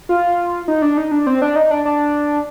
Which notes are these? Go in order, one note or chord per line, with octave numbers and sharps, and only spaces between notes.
F4
D#4
D4
D#4
D4
C4
D4
D#4
D4
D4